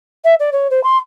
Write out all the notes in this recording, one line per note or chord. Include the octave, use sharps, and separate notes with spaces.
E5
D5
C#5
C5
C6